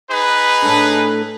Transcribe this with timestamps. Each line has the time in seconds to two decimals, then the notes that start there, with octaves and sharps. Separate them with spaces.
0.10 D#4 G#4 B4
0.62 A2 A3 D4